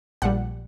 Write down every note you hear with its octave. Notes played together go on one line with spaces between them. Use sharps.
A#1 A#2 G3 F#5